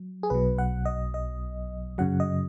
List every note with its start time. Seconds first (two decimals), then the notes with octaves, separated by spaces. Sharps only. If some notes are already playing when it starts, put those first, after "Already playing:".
Already playing: F#3
0.23 G#4
0.30 B1 B2 F#3 B4
0.58 F#5
0.86 D#5
1.14 D#5
1.98 F#2 C#3 F#3 F#5
2.20 D#5